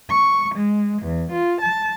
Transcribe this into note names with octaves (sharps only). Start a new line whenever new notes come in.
C#6
G#3
E2
F4
A5